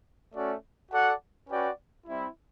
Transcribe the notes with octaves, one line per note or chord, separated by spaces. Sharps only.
A3 C#4 F#4 A4 D5
F#4 A4 D5 F#5
C#4 F#4 B4 D5 G5
G3 C4 E4